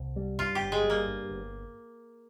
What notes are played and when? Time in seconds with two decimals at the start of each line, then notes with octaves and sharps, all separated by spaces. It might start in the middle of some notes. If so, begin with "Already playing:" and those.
Already playing: C2
0.16 G3
0.39 G2 F4
0.55 G4
0.61 G1
0.72 G#3
0.84 G3
0.90 A#3
1.07 G2
1.29 G1